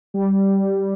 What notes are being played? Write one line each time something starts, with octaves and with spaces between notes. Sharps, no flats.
G3